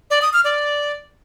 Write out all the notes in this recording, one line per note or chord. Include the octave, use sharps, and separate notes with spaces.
D5
D#6
F6
D5